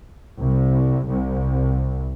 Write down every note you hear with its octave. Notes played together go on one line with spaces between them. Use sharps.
C2
C2